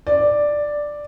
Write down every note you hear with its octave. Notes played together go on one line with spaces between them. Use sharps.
D5